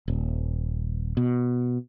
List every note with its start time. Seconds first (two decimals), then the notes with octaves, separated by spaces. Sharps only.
0.08 D#1
1.17 B2